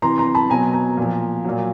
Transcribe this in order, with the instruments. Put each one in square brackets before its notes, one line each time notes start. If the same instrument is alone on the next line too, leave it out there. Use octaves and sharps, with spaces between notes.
[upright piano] C3 E3 A#5 C6
A#5 C6
A5 B5
B2 F#3 G#5 A#5
G#5 A#5
A#2 F3
A#2 F#3